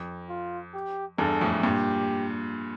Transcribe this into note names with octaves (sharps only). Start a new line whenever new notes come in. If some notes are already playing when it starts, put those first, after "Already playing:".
Already playing: F2
F4
G4
E2 G2 A4
F2 A2
G2 A#2 G4